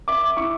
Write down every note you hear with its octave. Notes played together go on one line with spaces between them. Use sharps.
E5 D6
E4 C#6